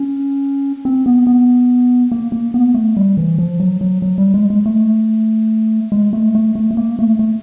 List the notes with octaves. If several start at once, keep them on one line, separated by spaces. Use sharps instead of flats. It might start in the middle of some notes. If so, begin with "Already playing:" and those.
Already playing: C#4
C4
B3
B3
A#3
A#3
B3
A3
G3
E3
F3
F#3
F#3
F#3
G3
G#3
G#3
A3
G#3
A3
A3
A3
A3
A#3
A3
A3